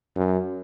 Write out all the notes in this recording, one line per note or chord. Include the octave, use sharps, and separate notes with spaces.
F#2